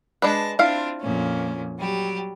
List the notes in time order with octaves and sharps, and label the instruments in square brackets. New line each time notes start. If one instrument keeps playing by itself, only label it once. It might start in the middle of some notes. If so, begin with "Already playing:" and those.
[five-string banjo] G#3 D4 B4 [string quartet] A5 A#6
[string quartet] C4 D4 F4 [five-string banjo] E4 F5
[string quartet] F2 A#2 C#4
F#3 G3 G4